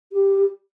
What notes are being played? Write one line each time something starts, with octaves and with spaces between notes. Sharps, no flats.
G4